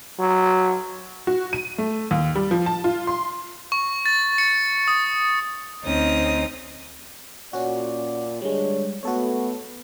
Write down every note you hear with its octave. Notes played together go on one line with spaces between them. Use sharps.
F#3
F#4
D#7
A3
D#2
G3
F3
A5
F4
C6
C#6
A6
C#7
D#6
D2 C4 C#4 D#4 D#6
A#2 C#4 F#4 D5
D3 G3 G#3 D4 C#5
A3 B3 F#4 A4 C#5